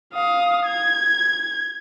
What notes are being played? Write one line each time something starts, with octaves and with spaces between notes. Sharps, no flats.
F5 D#6
G#6